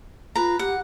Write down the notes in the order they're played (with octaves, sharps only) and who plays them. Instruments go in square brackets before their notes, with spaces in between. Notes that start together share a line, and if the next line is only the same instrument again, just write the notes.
[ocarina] F4 [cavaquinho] B4 A#5
[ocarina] G4 [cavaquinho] F#5